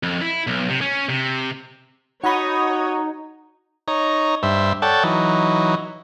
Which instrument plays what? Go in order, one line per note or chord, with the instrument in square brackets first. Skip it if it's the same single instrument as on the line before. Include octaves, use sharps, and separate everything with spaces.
[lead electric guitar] F2
E4
B1
C3
C#4
C3
[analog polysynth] D#4 [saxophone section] F#4 [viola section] C#5 D#5 [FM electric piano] F#5 B5
[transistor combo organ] D#4 C#5 A#5
G2 C5 E5
A4 C#5 D5 F#5 G5 A5
E3 F#3 D#4